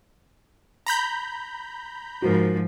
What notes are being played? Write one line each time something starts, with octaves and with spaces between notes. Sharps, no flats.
A#5 B5 G6
G#2 F3 F#4 A#4